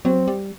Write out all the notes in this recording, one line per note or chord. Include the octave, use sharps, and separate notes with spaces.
F#3 C4
G3